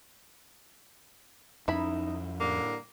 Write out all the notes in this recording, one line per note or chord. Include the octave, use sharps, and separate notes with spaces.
F2 C#4 D#4 E4 B5
A2 D3 G3 A#3